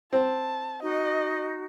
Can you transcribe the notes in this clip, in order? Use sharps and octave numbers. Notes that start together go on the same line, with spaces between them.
C4 A5
D#4 F#4 D#5